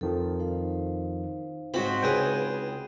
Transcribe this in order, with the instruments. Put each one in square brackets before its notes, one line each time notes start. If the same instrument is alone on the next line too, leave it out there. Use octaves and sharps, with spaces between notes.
[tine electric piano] F2 D#3 F3 [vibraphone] A4
[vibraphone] D#4 C5 F5
[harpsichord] G#2 B5 [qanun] C4 F#4
[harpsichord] C#2 G#4 [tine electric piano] B4 G5